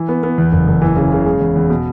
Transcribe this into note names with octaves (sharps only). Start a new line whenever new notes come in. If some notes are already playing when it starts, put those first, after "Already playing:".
Already playing: E3
B3
B3
E2
F#1
F#1
E3
C#3
C#3
G#3
E2
E2
B2